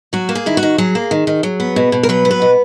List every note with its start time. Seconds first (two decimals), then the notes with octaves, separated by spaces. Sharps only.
0.13 F#3 F#4
0.29 A#3
0.35 G#4
0.46 D#3 E4
0.57 F#4
0.63 D#3
0.78 F#3 G#4
0.95 A#3
1.11 D#3
1.27 D#3
1.43 F#3
1.60 B3
1.76 B2
1.92 B2
2.03 A#4
2.09 F#3 B4
2.25 B3
2.31 B4
2.42 B2